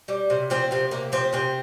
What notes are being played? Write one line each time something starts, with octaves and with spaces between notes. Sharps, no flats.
G3
C3
F3 C4
C3 C4
C3 A#3
F3 C4
C3 C4